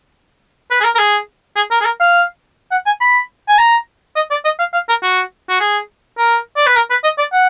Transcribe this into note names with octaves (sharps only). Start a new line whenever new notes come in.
B4
G#4
A#4
A#4
G#4
G#4
A#4
G#4
A#4
F5
F#5
G#5
B5
G#5
A#5
D#5
D5
D#5
F5
F5
A#4
F#4
F#4
G#4
A#4
D5
B4
A#4
B4
D#5
D5
F#5